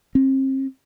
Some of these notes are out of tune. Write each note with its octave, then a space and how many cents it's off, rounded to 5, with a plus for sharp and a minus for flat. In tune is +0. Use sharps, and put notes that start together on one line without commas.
C4 +35